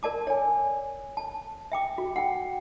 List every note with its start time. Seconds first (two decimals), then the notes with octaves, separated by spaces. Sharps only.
0.03 A#4 D5 A5 D6
0.27 C#5 G#5
1.17 A5
1.72 E5 G5 D6
1.98 F#4
2.16 F#5 G5